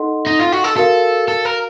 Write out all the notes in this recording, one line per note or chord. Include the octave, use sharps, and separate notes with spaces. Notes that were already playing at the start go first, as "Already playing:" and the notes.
Already playing: D#4 A4 D#5 F#5 C6
D#4
F4
F#4
A4
F#4 A4 A#4 F5
A4
A#4